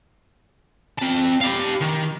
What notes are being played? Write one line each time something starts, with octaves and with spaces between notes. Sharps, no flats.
C4 A5
G4 F5
D#3